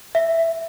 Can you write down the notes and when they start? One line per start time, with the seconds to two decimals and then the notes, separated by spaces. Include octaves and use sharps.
0.15 E5